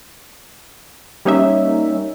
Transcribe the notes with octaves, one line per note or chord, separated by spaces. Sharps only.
G3 A#3 C#4 D#4 C#5 E5